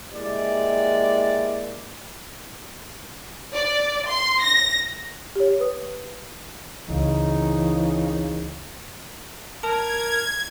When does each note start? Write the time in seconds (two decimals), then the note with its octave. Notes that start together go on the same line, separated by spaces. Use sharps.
0.13 G#3 A#3 E4 G4 D5
3.55 D5
4.08 C6
4.43 A#6
5.36 G4 C#5
5.60 B4 D#6
6.88 G#1 C#2 C#3 E3 D#4
9.63 A#4 A5 G#6